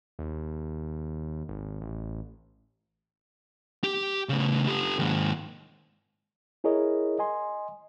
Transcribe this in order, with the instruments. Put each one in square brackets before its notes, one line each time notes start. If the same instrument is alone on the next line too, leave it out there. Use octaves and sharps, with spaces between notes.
[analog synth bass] D#2
G#1
A1
[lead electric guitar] G4
C#3 A3
G4 A4
D#2 G#2
[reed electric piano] E4 G#4 A#4 C#5 D#5
D#5 G#5 C6